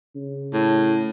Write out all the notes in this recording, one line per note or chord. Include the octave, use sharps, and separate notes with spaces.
C#3
A2